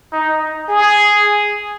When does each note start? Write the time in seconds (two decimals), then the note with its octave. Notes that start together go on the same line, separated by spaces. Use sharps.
0.13 D#4
0.69 G#4